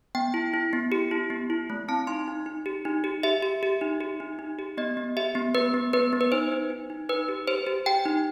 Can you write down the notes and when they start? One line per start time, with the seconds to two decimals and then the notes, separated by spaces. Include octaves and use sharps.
0.15 B3 G5
0.34 E4
0.54 E4
0.73 B3
0.92 G4
1.11 E4
1.30 B3
1.50 E4
1.70 A3
1.88 C4 A5
2.07 D#4 C6
2.28 D#4
2.46 D#4
2.66 G4
2.85 D#4
3.04 G4
3.23 G4 E5
3.43 G4
3.63 G4
3.81 D#4
4.01 G4
4.20 D#4
4.39 D#4
4.59 G4
4.78 B3 D#5
4.97 B3
5.17 G4 E5
5.35 B3
5.55 B3 B4
5.74 B3
5.93 B3 B4
6.13 B3
6.21 B4
6.32 D#4 C5
6.52 D#4
6.70 D#4
6.90 D#4
7.09 D#4 B4
7.28 G4
7.48 G4 C5
7.67 G4
7.86 G4 G5
8.05 D#4